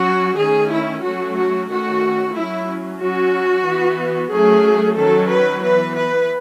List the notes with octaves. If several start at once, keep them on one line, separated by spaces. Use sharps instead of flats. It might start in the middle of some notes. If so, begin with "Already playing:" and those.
Already playing: F#3 C#4 F#4
D#3 A3 C#4 G#4
E4
F#3 A3 C#4 F#4
F#4
D#3 A3 C#4 F#4
F#3 C#4 E4
F#3 C#4 F#4
E3 B3
F#3 A3 C#4 G#4
D#3 F#3 C#4 A4
B4
E3 B3 B4
B4